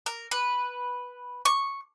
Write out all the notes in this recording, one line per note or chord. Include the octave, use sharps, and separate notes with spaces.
A#4
B4
C#6